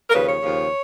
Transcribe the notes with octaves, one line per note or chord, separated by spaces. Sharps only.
A#4
D#2 C#3 F3 B4
C#5
D#2 C#3 F3